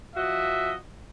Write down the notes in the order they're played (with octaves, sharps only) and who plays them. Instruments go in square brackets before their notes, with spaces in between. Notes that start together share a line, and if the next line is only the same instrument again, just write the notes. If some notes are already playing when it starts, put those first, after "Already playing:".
[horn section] F3 F#4 D#5 [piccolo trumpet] E5